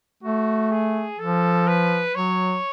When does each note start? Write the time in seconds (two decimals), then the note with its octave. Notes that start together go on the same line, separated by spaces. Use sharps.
0.23 A3 F#4
0.72 G#4
1.19 F3 A4
1.67 B4
2.15 F#3 C#5